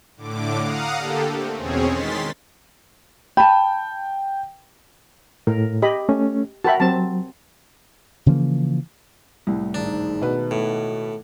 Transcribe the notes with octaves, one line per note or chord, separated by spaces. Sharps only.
A2 D3 D6
F5 F#5 A#5 D#6
D3 A#3 G4 A4
A3 C4
E2 B2 C4 C#4 G#4 C#5
D#3 G#3 C6 A6 B6
G5 A5 B5
A2 A#4
G4 D#5 B5
A3 C#4
F#4 A#4 E5 G5 A5 B5
F#3 C4 A5
C#3 E3 F3 A#3
C2 A2
G#1 D4 D#4 D#7
B2 A3 B4
A2 D6 G#6 C#7